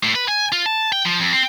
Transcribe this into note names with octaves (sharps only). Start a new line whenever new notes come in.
A2
B4
G#5
F4
A5
G5
F3
F2
C4